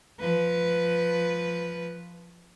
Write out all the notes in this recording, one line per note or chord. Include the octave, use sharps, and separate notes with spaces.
F3 B4